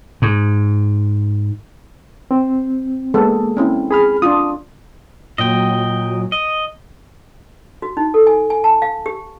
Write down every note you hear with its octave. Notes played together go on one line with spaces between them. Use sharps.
G#2
C4
G#3 A#3 B3 A4
C4 C#4 E4
G#4 B5 F6
D4 F4 D#6
A#2 F#3 D#5 G5
D#5
F#4
D#4
A4
G#5
G#5
A5
F5
G4